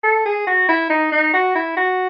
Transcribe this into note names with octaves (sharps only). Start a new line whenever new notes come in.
A4
G#4
F#4
E4
D#4
D#4
F#4
E4
F#4